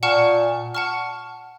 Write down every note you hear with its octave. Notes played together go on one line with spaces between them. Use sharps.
A#2 F#5 A5 C#6 F6
F#5 A5 C#6 F6